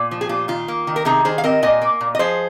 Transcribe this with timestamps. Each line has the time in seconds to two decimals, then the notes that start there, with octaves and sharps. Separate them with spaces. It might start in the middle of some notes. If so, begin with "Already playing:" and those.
Already playing: A#2
0.11 F3
0.21 G#4
0.29 A#2 F4
0.48 D#3 F4
0.68 A#3
0.87 D#3
0.96 A#4
1.05 C3 D#4 G#4
1.25 D#3 G#4 C5
1.38 F5
1.44 C4 A#4 D#5
1.62 A#2 D#5 G#5
1.82 A#3
2.01 A#2
2.15 D#5
2.19 F3 G#4 C5